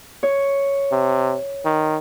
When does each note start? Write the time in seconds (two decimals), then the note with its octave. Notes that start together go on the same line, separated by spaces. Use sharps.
0.23 C#5
0.92 C3
1.65 D#3